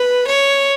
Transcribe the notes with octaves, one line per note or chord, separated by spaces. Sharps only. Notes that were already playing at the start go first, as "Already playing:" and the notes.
Already playing: B4
C#5